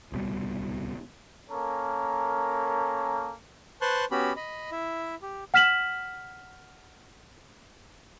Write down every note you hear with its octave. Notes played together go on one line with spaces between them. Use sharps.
D1 C2 B2 G3
A#3 C#4 A4 A#4
B4 C5 A5 C6 C#6 F#6
B3 C#4 F#4 G4 B5
D#5 B5
E4 E5
G4
F#5 F6 B6 E7 F#7